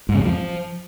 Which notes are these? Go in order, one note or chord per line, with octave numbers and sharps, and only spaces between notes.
G#2
C#3
F2
F3